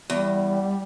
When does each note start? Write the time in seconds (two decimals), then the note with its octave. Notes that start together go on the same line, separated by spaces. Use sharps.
0.10 E2 G3